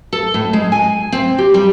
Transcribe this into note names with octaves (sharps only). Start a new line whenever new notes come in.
A4
A2
G#3
G#5
C4
G4
G3